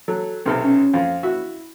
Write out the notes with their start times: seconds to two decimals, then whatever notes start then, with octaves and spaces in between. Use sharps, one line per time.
0.08 F#3 A4
0.46 B1 C3 C4 A4 F6
0.64 C#4
0.94 F2 F4 F5
1.23 E4 F#4 E5